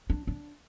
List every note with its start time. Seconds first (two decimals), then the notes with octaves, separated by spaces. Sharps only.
0.10 D4
0.27 D4